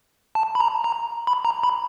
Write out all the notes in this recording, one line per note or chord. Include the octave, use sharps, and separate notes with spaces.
A5
B5
A#5
A#5
B5
A#5
B5